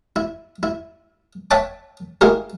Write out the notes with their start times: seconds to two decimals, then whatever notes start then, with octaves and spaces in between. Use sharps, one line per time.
0.16 E4
0.63 E4
1.51 C#5 E5 F#5 G5 A5 D6
2.21 G#3 A#3 E4 F#4 G4 A#4